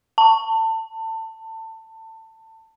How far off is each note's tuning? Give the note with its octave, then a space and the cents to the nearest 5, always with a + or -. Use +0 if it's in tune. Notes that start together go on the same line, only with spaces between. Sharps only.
A5 +25